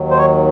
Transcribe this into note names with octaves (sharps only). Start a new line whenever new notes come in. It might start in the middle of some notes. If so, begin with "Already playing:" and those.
Already playing: D#2 D#3 F#3
C5
C#5